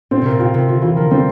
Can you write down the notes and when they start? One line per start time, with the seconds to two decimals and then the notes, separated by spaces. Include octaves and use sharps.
0.11 A#2 C4
0.22 C3 A#4
0.31 A#2
0.39 C3 F4
0.54 C3 A#4
0.68 D3 F4
0.82 E3 F4
0.97 F3 A#4
1.11 G3 C4